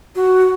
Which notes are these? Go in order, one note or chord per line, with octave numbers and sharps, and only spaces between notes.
F#4